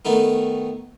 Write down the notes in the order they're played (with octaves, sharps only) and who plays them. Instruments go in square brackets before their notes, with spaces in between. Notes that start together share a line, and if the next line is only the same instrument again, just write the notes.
[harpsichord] D#3 A3 B3 D#4